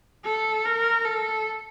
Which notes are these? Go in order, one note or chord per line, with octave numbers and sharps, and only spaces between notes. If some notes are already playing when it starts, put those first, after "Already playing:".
A4
A#4
A4